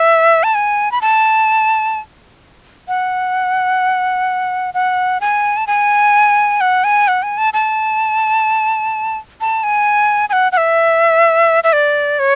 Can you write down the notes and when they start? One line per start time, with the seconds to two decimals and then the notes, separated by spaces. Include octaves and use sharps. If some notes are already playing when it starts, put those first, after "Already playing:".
Already playing: E5
0.44 A5
0.55 G#5
0.92 B5
1.01 A5
2.88 F#5
4.74 F#5
5.21 G#5
5.57 A5
5.67 G#5
6.61 F#5
6.84 G#5
7.08 F#5
7.23 G#5
7.38 A5
7.53 A5
9.41 A5
9.63 G#5
10.29 G#5
10.33 F#5
10.52 F#5
10.57 E5
11.64 E5
11.73 D5
12.19 C#5